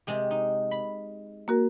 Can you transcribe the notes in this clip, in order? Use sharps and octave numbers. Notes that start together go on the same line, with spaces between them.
C3 G#3 G4
D#4
B5
A#3 F#4 A#4